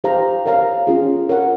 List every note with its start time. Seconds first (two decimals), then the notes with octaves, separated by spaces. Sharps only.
0.04 D#4 G4 C5 F5 A#5
0.46 A#4 C#5 F5 A#5
0.87 C#4 F4 G#4
1.29 A#4 C#5 F#5